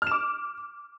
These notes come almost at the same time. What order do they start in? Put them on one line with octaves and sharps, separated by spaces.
F6 E7 D6